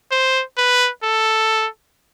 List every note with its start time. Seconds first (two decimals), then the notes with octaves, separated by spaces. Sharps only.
0.11 C5
0.58 B4
1.03 A4